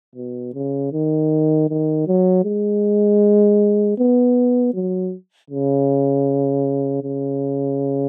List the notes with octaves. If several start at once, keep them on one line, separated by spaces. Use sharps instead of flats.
B2
C#3
D#3
D#3
F#3
G#3
B3
F#3
C#3
C#3